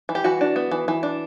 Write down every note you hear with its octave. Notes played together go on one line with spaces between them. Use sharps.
E3
G4
E3 F#4
D4
B3
E3
E3
D4